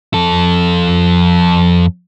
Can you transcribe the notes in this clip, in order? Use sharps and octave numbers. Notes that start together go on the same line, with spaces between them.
F2 A4